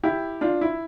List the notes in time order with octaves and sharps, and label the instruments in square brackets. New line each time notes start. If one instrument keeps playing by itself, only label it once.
[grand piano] E4 G4
D4 F4
E4